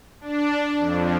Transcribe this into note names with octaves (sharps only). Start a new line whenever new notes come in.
D4
F2